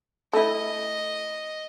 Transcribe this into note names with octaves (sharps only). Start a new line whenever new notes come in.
A3 E4 D#5